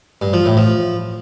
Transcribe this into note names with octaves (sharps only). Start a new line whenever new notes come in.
G2
F3
A2
F3